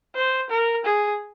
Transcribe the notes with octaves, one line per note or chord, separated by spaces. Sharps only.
C5
A#4
G#4